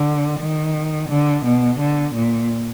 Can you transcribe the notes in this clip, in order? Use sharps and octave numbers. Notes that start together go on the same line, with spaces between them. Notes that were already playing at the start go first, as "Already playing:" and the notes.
Already playing: D3
D#3
D3
B2
D3
A#2